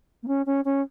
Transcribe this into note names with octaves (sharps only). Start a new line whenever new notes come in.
A#3
C#4
C#4
C#4